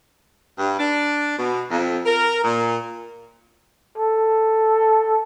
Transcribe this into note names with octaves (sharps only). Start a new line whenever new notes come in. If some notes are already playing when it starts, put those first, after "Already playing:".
G2
D4
B2
F2
A#4
A#2
A4